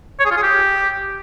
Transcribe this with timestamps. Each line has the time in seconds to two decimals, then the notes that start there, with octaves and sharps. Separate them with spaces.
0.19 C#5
0.25 G#4
0.31 F4
0.37 G#4
0.43 G4